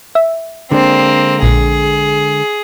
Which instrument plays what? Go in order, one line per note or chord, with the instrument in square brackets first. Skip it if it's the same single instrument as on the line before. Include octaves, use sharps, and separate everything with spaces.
[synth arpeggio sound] E5
[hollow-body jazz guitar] D3 G#3 D4 [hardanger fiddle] A#3 C4
[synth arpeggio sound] A#1 [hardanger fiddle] G#4